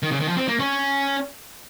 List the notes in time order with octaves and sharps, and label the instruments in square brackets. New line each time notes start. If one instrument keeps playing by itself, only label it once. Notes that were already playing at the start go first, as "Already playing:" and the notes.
[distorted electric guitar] D#3
C#3
D#3
F3
C4
A#3
C#4